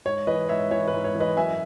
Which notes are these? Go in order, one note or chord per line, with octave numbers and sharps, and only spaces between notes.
G#2 C#5
E3 B4 D#5
G#2 C#5 E5
E3 C#5 E5
B4
G#2
C#5
E3
B4 D#5
F#2 E5 G#5